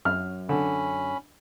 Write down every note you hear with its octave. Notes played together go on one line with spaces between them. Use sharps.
F#2 F6
D3 C#4 B5